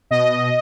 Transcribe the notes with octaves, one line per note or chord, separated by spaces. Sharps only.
B2 D#5